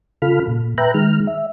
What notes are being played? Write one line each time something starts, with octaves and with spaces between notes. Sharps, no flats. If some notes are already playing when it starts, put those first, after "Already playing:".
C#3 F4 A4 B5 F6
A#2
B4 E5 G5 A#5 F#6
D#3 G#3 F6
E5